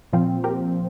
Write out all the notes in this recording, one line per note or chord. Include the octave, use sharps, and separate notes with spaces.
A#2 F3 C4 F4
G4 A#4